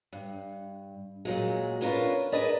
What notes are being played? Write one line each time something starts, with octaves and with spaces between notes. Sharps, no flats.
G2
A#2 F#3 G#3
C#4 D4 F4 G#4 A#4 B4
D4 G#4 A#4 B4 D5 D#5